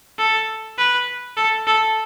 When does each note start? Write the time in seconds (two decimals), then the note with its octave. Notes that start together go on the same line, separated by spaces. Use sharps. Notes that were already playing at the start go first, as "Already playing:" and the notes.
0.19 A4
0.78 B4
1.37 A4
1.67 A4